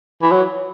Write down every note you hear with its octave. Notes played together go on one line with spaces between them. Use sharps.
E3
F#3